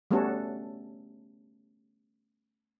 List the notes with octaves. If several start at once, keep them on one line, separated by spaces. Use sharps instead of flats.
G3 A3 B3 C#4 F#4 A4